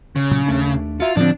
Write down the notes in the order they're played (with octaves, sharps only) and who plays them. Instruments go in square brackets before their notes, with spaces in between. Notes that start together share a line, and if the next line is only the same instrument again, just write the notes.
[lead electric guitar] C#3
[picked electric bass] A#2 F#3
D#2 A3 D4
[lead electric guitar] F4 [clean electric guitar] F#4 E5
[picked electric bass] A2 D3 [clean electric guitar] F3 C4 [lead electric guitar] D4